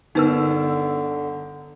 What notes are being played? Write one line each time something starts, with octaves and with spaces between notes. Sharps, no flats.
G1 D3 B3 D#4 A#4 B4 E6